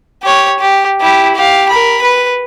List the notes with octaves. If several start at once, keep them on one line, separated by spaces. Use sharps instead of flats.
G4 C#5
G4
E4 G4
G4 F5
A#4 B5
B4